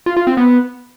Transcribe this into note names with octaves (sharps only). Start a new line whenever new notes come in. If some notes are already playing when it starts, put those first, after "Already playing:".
F4
F4
C4
B3